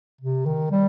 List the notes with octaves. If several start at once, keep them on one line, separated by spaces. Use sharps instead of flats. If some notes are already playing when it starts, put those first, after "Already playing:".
C3
D#3
G3